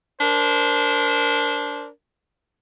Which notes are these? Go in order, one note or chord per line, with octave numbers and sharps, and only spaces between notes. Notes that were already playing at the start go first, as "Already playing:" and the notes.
D4 A#4 C5